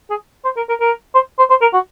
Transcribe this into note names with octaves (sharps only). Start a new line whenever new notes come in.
G#4
C5
A#4
A#4
A#4
C5
C5
C5
A#4
F#4